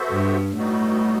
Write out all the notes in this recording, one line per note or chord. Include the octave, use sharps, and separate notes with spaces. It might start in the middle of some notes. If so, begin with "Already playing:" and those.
Already playing: B3 F#4 A4 C5 E5
G2
A2 G3 B3 D#4 F#4